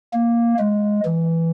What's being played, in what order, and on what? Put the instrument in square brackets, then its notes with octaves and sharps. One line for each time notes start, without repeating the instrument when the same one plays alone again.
[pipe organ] A#3
G#3
E3